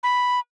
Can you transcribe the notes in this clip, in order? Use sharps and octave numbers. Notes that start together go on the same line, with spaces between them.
B5